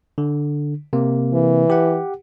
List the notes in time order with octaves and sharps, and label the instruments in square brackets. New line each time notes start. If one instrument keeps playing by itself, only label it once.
[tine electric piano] D3
C3 A#3
[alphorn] E3
[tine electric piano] G4 F#5